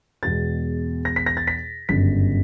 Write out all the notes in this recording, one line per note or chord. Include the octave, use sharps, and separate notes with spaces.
E2 B2 G#3 A6
A#6
B6
A#6
A6
B6
G1 F#2 C#3 B6